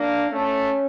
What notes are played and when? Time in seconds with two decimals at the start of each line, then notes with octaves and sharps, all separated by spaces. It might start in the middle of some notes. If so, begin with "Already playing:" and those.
Already playing: A#3 D4
0.31 A3 C#4